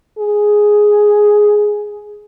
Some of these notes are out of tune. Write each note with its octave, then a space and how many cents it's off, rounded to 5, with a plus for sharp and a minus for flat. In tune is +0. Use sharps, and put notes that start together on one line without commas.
G#4 +5